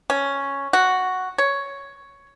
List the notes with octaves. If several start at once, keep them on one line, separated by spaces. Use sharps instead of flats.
C#4
F#4
C#5